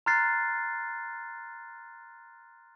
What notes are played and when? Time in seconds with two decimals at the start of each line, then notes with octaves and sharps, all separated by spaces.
0.06 A#5 C6 F6 F#6 A6 C7